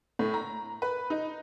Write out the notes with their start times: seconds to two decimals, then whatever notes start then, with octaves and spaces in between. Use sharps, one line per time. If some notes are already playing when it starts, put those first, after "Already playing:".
0.19 A2
0.34 A#5
0.82 B4
1.10 D#4